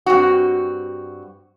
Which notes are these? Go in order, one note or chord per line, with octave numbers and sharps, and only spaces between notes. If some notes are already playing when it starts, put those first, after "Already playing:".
G2 C4 F#4